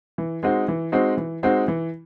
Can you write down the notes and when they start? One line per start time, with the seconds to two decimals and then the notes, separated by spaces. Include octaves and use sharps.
0.18 E3
0.43 G#3 C4 D#4 F#4
0.68 E3
0.92 G#3 C4 D#4 F#4
1.17 E3
1.43 G#3 C4 D#4 F#4
1.68 E3